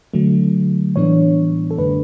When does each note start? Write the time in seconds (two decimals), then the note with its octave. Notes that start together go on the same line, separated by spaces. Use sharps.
0.14 D3 F#3 A3
0.96 A2 E3 G3 B3 D4 C#5
1.71 A4
1.78 F#2 D3 A3 D4 B4